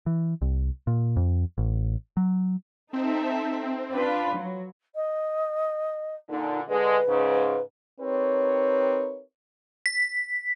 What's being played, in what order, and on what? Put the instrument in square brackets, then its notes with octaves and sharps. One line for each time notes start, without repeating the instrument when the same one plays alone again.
[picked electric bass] E3
C2
A#2
F2
A1
F#3
[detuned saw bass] C4 [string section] D#4 A4 E5
[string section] D4 F4 B4
F#3
[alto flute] D#5
[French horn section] A#2 D3 [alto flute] D#4
[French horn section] D3 G#3 [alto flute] B4
[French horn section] G#2 C#3
[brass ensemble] C4 D#4 G4 A#4 B4 C#5
[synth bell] B6